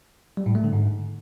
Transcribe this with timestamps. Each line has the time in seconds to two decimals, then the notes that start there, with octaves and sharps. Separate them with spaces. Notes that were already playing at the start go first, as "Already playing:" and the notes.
0.37 G3
0.46 A2
0.55 A3
0.64 D3
0.73 G#2